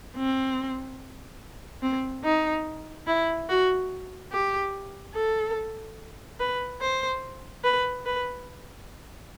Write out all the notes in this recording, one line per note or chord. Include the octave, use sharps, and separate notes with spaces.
C4
C4
D#4
E4
F#4
G4
A4
B4
C5
B4
B4